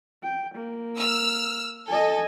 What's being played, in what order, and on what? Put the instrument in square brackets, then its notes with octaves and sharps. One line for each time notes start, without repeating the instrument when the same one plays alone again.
[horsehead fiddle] G5
A#3
[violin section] E6 F6
[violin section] A4 [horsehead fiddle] D#5 G#5